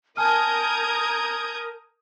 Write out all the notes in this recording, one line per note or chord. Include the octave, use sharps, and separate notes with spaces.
A#4 G#5 A5 D#6 F6 G6 G#6